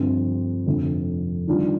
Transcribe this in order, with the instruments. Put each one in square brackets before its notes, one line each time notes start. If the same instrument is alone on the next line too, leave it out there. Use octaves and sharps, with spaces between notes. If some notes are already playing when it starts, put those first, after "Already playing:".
Already playing: [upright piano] G2 D3 F3 C4
F1 F2 D3
D#3 G3 D4 F4